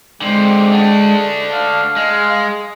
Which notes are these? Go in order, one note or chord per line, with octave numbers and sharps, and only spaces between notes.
D3 G#3 C4
A3 D4
F5
G#3